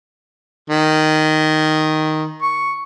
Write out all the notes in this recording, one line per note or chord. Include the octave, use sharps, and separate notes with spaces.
D#3
C#6